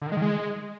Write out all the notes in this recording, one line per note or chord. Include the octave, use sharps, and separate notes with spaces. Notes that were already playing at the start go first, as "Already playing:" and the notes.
D3
D#3
G#3
D#3
G#3